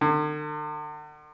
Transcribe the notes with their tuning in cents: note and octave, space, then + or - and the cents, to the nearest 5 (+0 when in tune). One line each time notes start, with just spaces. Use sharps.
D3 +45